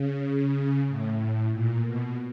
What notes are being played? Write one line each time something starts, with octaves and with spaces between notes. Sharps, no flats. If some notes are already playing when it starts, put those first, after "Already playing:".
Already playing: C#3
A2
A#2
B2